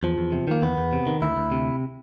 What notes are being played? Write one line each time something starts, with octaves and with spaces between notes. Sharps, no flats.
E2 F3
E2
C3
D#3 A#3
E2 B3
E2
C3
D#3
D2 E4
D2
C3